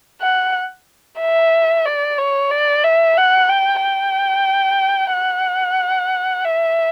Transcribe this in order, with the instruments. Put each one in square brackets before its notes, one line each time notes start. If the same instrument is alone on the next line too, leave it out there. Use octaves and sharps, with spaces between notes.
[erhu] F#5
E5
D5
C#5
D5
E5
F#5
G5
G5
F#5
E5